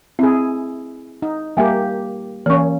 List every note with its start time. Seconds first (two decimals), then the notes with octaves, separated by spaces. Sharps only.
0.19 C4 E4 G#4
1.22 D#4
1.57 G3 A#3 G4 E5 G5 G#5
2.46 E3 A#3 C#4 C#6